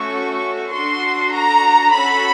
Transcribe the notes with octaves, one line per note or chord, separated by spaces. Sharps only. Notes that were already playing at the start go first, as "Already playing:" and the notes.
Already playing: A3 C#4 F#4 A4 C#6
D4 F#4 A4 C6
A#5
C#4 F#4 A4 B5